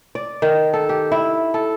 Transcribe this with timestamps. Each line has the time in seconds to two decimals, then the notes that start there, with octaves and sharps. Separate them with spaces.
0.15 D5
0.42 D#3
0.73 A4
0.89 G4
1.12 E4
1.54 A4